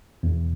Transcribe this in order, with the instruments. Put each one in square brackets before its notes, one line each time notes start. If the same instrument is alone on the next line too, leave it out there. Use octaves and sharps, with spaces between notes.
[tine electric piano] E2